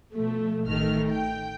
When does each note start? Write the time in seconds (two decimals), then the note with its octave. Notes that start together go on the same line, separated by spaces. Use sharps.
0.14 B2 F3 A3
0.67 A1 D#3 A3 F6
1.09 G5